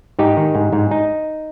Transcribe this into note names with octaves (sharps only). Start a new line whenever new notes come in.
G#2 D#4 G4
D#3
G#2
G#2
D#4